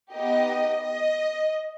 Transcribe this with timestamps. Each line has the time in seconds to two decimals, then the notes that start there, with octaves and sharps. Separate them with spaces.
0.13 B3 D#4 G4 D#5
0.85 D#5